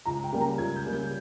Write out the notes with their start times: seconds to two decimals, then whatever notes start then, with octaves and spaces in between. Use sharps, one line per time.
0.05 C#2 A#5
0.24 G5
0.32 C#3 G3 A#3
0.41 A#5
0.58 C#2 G#6
0.76 G6
0.84 C#3 G3 A#3
0.93 G6